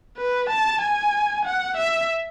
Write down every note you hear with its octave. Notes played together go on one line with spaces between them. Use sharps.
B4
A5
G#5
F#5
E5